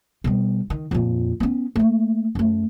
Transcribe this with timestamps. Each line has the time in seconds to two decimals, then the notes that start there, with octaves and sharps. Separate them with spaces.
0.24 B2 G3
0.70 D#3
0.91 F2 A#2
1.40 B3 C#4
1.76 A3 A#3
2.35 F#2 A3